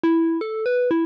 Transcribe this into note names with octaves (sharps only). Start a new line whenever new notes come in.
E4
A4
B4
E4